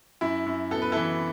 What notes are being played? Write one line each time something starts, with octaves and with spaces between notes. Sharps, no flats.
F#2 E4
F#2
B3 A4
B4
E3 E4 A4